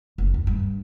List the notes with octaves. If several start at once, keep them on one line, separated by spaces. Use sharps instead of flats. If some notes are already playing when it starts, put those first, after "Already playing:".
F#1
D#2
G2